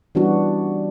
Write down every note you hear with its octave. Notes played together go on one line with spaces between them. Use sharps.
E3 G3 B3 C#4 D4 F#4